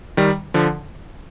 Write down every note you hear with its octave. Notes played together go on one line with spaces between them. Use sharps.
D#3 G3
D3 F3